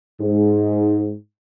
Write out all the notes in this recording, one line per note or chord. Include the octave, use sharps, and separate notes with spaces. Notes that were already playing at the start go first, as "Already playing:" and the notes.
G#2